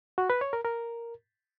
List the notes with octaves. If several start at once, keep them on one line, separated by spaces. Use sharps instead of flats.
F#4
B4
C#5
A#4
A#4